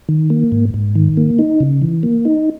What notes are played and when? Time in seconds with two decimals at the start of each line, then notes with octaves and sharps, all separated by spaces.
0.09 D#3
0.30 A#3
0.52 G#2
0.74 G#2
0.95 D#3
1.17 A#3
1.39 D#4
1.60 C#3
1.82 E3
2.03 A#3
2.25 D#4